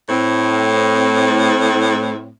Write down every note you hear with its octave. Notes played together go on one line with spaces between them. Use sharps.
A2 C4